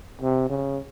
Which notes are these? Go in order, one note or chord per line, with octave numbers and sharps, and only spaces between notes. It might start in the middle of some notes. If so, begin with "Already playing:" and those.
C3
C#3